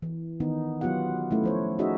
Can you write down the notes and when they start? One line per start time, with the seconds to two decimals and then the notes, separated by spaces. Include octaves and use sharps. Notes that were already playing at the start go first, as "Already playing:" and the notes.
0.02 E3
0.40 D#3 B3 D#4
0.81 F#3 B3 F4 G4 F#5
1.31 A3 C#4 E4
1.44 F3 C5 C#5
1.78 C#4 D#4 F#4 G#4 D#5 E5